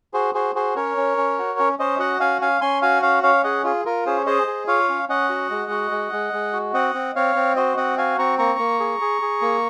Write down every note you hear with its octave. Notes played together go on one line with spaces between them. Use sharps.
F#4 G#4 C5
F#4 G#4 C5
F#4 G#4 C5
C#4 A#4 C#5
C#4
C#4
F#4
C#4
C#4 C5 D#5
F#4 D#5 F#5
C#4 F5 G#5
C#4 F5 G#5
C#4 G#5 C6
F#4 F5 G#5
C#4 C#5 F5
C#4 C#5 F5
G#4 D#5 F#5
F4 G#4
F4 A#4
C#4 G#4 C5
G#4 C5 D#5
G#4
F4 C#5 F5
C#4
C#4 D#5 F#5
F#4
G#3
F#4
G#3
G#3
G#3
F#4
C4 D#5 F#5
C4
C4 C#5 F5
C4
F#4 C5 D#5
C4 D#5 F#5
F#4 F5 G#5
C4 A#5 C#6
A#3 A#5 C#6
A#3
G#4
G#4
G#4
A#3